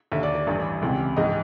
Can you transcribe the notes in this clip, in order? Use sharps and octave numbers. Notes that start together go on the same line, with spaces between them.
D#2 D3 E5
D5
D5
A1 G2 E3
C#2 C3 E3
A#1 G#2 E3 D#5